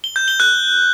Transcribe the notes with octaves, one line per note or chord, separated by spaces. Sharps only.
G7
G6
G7
F#6